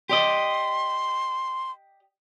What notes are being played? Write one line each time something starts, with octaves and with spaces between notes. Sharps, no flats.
G4 D5 D#5 C6